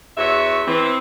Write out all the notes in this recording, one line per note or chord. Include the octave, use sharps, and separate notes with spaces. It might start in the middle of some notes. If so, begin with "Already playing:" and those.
E2 F#4 C#5 E5
E3 C4